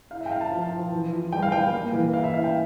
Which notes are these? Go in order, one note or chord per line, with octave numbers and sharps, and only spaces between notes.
E4 F5
E5
G5
E4 F5
A5
F3
F3
E3
F4
G3 G5
F5
G3 G5
A#3
E3
E4 F5
E5
E4 F5
G5